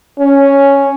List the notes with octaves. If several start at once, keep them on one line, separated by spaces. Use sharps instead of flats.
C#4